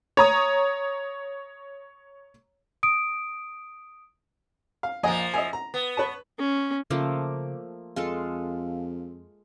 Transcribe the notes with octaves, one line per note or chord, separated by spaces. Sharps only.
C#5 A#5 D#6
D#6 D7
F5
A#1 F3 A#3 D#5 G#5
D#5 E5 G#5
A#5
B3
B4 C#5 A5
C#4
C#3 F3 A3 A#3 D6
F2 G#3 F4 A4 F5